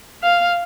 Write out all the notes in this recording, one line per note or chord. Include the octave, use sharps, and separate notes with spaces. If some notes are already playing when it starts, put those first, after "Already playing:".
F5